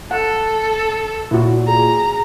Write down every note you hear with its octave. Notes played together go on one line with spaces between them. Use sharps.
A4 F#5
A#2 E4 F#4
G#4 A#5